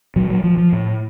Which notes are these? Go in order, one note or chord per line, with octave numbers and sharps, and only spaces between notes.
A#2 F#3
F#3
F3
F3
A2